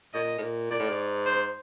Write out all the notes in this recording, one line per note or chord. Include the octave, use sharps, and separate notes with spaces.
A#2 D#5
A2
A#2
A#2 D5
A2
G#2
C5